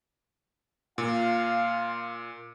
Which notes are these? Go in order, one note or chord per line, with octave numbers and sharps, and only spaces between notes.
A#2 F4 F5